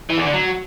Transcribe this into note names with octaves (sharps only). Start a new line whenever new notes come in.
E3
E2
D3
F#3